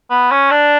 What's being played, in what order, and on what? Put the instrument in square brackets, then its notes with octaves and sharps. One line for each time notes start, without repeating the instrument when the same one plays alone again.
[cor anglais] B3
C#4
D4